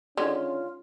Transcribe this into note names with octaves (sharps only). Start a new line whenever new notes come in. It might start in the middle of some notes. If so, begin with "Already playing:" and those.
D3 D#3 G#3 C#4 F4